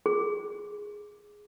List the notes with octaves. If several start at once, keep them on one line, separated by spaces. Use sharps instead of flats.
G#4